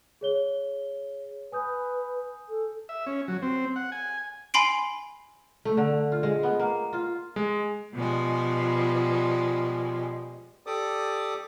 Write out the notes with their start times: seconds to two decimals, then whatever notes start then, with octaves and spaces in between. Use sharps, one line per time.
0.21 G#4 C#5 G7
1.52 B4 G#5 D#6 G6
2.49 A4
2.89 E5
3.06 C#4
3.28 F#3
3.42 C4
3.76 F#5
3.92 G#5
4.54 G#5 B5 C6 C7 D7
5.65 A3
5.77 D3
6.12 F4
6.23 G#3
6.43 B3
6.59 A#3
6.93 F4
7.36 G#3
7.93 B2 F3 G3 G#3
10.66 G4 A4 D5 D6 D#6